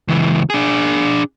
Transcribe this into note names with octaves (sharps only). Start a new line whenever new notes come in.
C#2 E3
D4 G#4